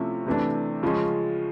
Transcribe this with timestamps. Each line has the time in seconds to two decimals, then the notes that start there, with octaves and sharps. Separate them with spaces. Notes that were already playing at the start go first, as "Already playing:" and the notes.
Already playing: C3 F3 A3 C#4 E4
0.26 C3 E3 A3 D4
0.83 C#3 F3 G#3 C#4